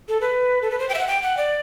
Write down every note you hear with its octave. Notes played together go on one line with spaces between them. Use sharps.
A4
B4
A4
B4
C5
G5
E5
F#5
G5
F#5
D5